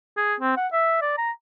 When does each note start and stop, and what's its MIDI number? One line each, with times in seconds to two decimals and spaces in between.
0.17 0.34 68
0.40 0.55 60
0.57 0.67 78
0.72 0.97 76
1.02 1.15 74
1.18 1.31 82